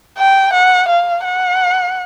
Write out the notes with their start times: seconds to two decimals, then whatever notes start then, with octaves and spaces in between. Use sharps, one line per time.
0.18 G5
0.53 F#5
0.88 F5
1.24 F#5